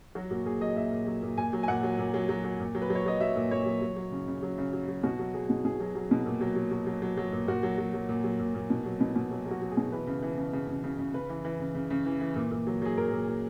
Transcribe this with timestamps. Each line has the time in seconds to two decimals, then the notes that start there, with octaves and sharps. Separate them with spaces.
0.15 F#3 F#4
0.31 A#2 F#4
0.46 A#2 G#4
0.61 F#3 D#5
0.76 A#2 E5
0.92 A#2
1.07 F#3
1.23 A#2
1.38 A#2 G#5
1.53 F#3
1.63 G#5
1.68 A#2 F#5
1.83 F#3
1.99 A#2
2.14 F#3
2.29 F#3
2.44 F#3
2.60 A#2
2.75 F#3
2.82 B4
2.90 F#3
2.95 C#5
3.06 F#3 D#5
3.21 F#3 E5
3.36 A#2
3.51 A#2 C#5
3.66 F#3
3.82 F#3
3.97 F#3
4.12 C#3
4.28 C#3
4.43 F#3
4.58 C#3
4.73 F#3
4.89 F#3
5.03 B2 F#4
5.19 F#3
5.34 F#3 G#4
5.50 B2
5.65 B2 G#4
5.80 F#3
5.95 F#3
6.11 B2
6.26 A#2
6.41 F#3
6.56 F#3
6.71 F#3
6.87 F#3
7.02 F#3
7.18 F#3
7.33 A#2
7.48 A#2 F#4
7.63 F#3
7.78 F#3
7.94 F#3
8.09 A#2
8.24 F#3
8.39 A#2
8.55 A#2
8.70 B2
8.86 F#3
9.01 B2
9.16 B2
9.31 F#3
9.46 F#3 F#4
9.62 F#3
9.71 G#4
9.77 B2
9.92 E3 B4
10.07 C#3
10.23 E3
10.38 C#3
10.53 C#3
10.68 C#3
10.84 C#3
10.99 C#3
11.14 C#3 B4
11.29 E3
11.45 E3
11.59 C#3
11.75 C#3
11.90 C#3
12.06 E3
12.21 E3
12.36 A#2
12.51 A#2
12.67 F#3
12.82 F#3 G#4
12.98 A#2 A#4
13.12 A#2
13.28 A#2